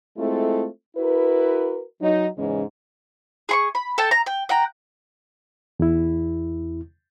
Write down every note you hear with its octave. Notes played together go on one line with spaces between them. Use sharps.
G#3 A3 C4 E4 F4 A4
E4 F#4 A#4 B4
F#3 D#4
E2 G#2 C#3 E3 G#3 C#4
G#4 C6 C#6
B5
A4 G5 A5
A#5
G5
F#5 G5 A#5
E2 E4